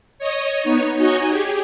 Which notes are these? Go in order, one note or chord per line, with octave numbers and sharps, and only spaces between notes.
C#5 D#5 D#6
B3 D#4 C#5
D#4 F#4 C#5 D#5 G#5
G4 G#4